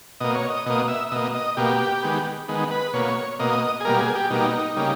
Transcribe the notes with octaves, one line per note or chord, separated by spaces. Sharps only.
B2 A#3 D#5
C#5
D#5
B2 A#3 D#5
E5
B2 A#3 D#5
D#5
B2 A#3 G4
D#3 G#3 B3
D#3 G#3 B3
B4
B2 A#3 C#5
B2 A#3 D#5
G#4
B2 G3 A#3 A#4
G#4
G4
B2 G3 A#3 D#4
C#3 G3 A#3